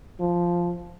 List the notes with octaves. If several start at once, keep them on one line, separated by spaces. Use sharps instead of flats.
F3